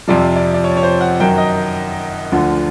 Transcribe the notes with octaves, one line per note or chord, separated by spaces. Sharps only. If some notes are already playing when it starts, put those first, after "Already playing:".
F2 C3 F3 D5
D5
D5
C#5
C#5
C5
F#5
F#2 D#3 F#3 G5
D#5
D2 D3 F3